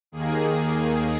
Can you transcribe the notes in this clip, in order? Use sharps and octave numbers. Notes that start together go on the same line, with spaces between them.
D#2 D#3 A#3 G#4